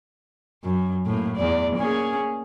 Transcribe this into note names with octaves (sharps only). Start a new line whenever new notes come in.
F#2
A2 A#3
E2 D5
A#3 C#4 G#4